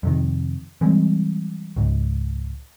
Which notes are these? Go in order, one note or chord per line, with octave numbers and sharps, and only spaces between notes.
F2 C3 D#3
E3 G3 G#3 C4
C#2 G#2